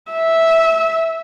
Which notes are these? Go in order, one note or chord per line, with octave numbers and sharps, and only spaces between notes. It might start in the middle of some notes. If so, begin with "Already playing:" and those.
E5